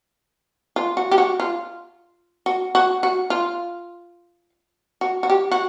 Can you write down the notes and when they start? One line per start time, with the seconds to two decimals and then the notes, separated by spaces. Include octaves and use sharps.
0.76 F4
0.97 F#4
1.11 G4
1.18 F#4
1.40 F4
2.46 F#4
2.75 F#4
3.03 F#4
3.30 F4
5.01 F#4
5.23 F#4
5.30 G4
5.51 F#4